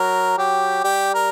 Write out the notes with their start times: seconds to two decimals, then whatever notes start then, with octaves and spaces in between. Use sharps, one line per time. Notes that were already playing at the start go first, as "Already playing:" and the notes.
Already playing: F#3 A#4
0.38 F#3 G4
0.84 G3 G4
1.14 A#4